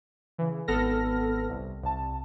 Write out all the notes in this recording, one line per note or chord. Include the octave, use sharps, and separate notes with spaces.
C#3 E3
G#1 B3 A4 F6 A#6
C2
C2 A5